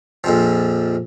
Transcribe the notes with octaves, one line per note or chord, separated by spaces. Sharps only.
A#1 F2 F3